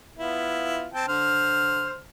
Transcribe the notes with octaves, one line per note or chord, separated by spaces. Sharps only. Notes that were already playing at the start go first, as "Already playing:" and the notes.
B3 E4 F4
C4 G5 A5
D3 C5 F6